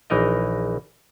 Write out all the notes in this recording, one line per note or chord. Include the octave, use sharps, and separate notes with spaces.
A#1 E3 D#4 A#4 D#5